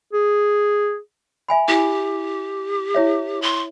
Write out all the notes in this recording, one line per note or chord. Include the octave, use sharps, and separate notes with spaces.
G#4
E5 G#5 B5
E4 G4 G#5
E4 C#5 E5
C6